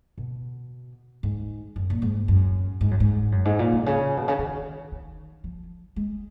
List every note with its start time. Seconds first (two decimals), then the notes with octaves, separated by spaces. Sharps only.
0.18 B2
1.23 G#2
1.76 F#2
1.90 A#2
2.02 G#2
2.28 F#2
2.81 G#2
2.91 F#2
3.00 G#2
3.32 F#2
3.45 G#2
3.59 A#2
3.73 B2
3.86 C#3
4.17 B2
4.28 C#3
4.39 D#3
4.92 D#3
5.44 F3
5.96 G#3